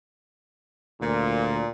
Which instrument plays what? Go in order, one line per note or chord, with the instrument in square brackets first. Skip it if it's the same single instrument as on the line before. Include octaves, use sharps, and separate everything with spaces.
[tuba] D2 [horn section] A#2